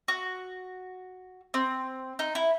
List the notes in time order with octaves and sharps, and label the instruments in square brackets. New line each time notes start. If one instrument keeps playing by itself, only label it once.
[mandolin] F#4
C4
D#4
E4